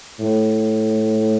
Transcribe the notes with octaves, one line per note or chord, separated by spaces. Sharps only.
A2